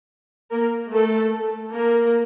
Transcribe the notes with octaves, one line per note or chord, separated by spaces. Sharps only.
A#3 A#4
A3 A4
A#3 A#4